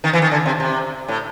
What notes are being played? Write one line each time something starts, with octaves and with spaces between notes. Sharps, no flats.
D#3
E3
D#3
D3
C3
C3
A2